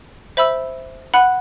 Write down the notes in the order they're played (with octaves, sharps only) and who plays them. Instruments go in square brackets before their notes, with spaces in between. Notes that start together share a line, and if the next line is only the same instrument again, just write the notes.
[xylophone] C5 E5 B5 E6
F#5 B5 F#6